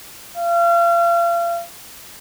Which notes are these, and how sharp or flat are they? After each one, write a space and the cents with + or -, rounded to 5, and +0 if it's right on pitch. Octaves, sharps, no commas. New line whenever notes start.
F5 -35